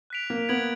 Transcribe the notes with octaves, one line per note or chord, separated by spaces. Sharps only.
F#6 B6 D7 F7
A#3
B3 G#6 D7 F#7